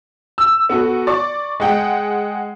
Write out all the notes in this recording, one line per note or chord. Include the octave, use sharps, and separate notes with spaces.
E6
B3 F#4 A4
D5 C#6
G#3 D#5 F#5 G5